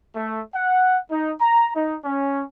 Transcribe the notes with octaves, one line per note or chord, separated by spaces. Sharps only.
A3
F#5
D#4
A#5
D#4
C#4